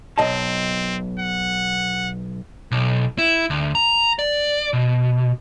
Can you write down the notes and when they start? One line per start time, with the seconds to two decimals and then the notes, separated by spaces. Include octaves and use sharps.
0.18 B1 C4 D#5 A5
1.19 F#5
2.71 B1
3.18 E4
3.50 D2
3.75 A#5
4.19 D5
4.73 B2